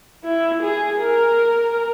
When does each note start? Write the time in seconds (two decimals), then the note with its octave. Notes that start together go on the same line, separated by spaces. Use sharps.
0.25 E4
0.62 G#4
1.01 A#4